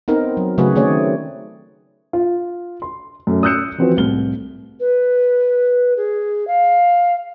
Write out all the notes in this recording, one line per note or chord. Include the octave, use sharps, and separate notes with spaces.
B3 C4 D#4 A#4
F#3
C#3 F#3 A3 F#4 G#4 B4
D#3 A3 C4 G#4 C#5 D5
F4
C6
F#2 A3
D#6 E6 F#6 G6 C#7 E7
E3 F3 C4 F#4 B4 C5
C2 A2 F6 G7
B4
G#4
F5